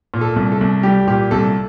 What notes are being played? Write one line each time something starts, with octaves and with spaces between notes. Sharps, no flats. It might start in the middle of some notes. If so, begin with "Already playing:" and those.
A#2
A4
C2
A4
C2
G3 G4
A#2 G4
C2 A4